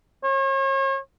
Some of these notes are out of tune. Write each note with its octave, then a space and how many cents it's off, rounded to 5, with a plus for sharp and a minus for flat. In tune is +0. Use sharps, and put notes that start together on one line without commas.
C#5 -40